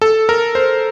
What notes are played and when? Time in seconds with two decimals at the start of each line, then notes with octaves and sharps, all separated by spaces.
0.02 A4
0.29 A#4
0.55 C5